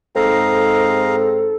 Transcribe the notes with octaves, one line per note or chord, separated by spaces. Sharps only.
G#2 C4 A4 D#5 F5 A#5